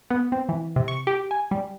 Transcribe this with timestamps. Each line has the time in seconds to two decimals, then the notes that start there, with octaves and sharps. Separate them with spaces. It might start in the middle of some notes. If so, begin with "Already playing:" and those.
0.10 B3
0.32 C4
0.49 E3
0.76 C3
0.88 C#6
1.07 G4
1.31 G#5
1.51 G3